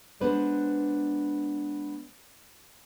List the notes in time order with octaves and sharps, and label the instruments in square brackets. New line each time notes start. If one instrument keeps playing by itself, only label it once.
[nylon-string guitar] G#3 B3 D4 B4 C5 D5